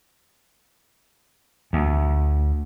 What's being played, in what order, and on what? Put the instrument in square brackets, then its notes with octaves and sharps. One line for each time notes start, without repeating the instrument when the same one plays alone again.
[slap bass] D2